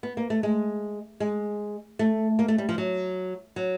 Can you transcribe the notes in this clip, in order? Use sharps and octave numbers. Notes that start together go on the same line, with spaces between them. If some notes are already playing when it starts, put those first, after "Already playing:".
B3
A#3
A3
G#3
G#3
A3
A#3
A3
G3
F3
F#3
F#3